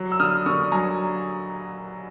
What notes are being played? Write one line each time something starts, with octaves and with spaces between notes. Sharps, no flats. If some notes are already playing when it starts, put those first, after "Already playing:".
Already playing: F#3
E6
D3 D#6 F6
D3 C#6 D#6
F#3 G#5 A#5